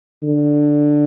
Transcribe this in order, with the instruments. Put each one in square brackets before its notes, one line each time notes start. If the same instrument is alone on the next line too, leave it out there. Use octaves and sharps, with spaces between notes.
[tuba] D3